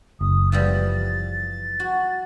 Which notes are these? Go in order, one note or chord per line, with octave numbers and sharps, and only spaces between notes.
F#1 D#6
E3 F3 G3 A6
F#4